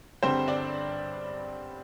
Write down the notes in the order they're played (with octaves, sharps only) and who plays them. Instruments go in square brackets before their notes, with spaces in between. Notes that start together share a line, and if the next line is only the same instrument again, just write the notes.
[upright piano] G1 G2 D3 G3 C4 C5
D4 D5